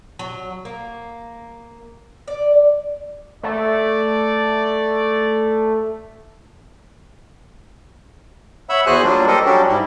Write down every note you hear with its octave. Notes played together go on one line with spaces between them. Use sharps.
F#3
A#3
D5
A3 D5
C#5 E5 F#5 B5 E6
E2 F#4 G#4 C5 G#5 F#6
F#3 G3 A#3 D4 F4
G4 A4 A#4 C5 D#5
F#3 G3 C#4 D4 F#4 G4
G#2 G3 E4